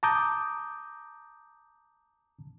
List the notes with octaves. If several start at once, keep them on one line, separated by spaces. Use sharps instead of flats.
A5 A#5 D6 D#6 G6